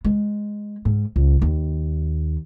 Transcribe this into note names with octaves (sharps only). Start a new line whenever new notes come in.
G#3
G#2
C#2
D#2